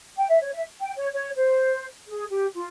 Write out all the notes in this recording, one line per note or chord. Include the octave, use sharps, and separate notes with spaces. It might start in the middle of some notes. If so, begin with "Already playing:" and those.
G5
E5
C#5
E5
G5
C#5
C#5
C5
G#4
G4
F4